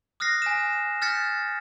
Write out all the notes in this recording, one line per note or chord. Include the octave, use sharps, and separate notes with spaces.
D#6 F6 F#6 A#6 C7
G#5 B6 E7
F6 G6 A6 B6 C#7